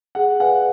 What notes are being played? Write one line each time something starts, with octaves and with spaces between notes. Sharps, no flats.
G#4 F#5
B4 D5 F5 F#5 G#5